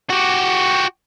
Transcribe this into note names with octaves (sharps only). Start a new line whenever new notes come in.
F#4 G4